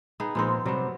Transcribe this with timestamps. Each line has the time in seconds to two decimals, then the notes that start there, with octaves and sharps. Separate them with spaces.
0.20 B3 D#4 G#4
0.35 A#2 F3 G#3 B3 C4 D#4
0.65 C3 F#3 G3 B3 C5